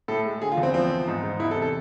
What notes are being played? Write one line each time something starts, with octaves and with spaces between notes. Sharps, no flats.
A2 A4
G#3
D3 G#4
F4
E2
C4
F3 C4
E2
G#2
G#2
E2 E4
A4
C3
A4